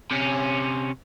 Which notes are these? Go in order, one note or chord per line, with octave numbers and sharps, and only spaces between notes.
C3 C#4